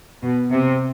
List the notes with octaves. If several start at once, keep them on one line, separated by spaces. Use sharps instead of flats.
B2
C3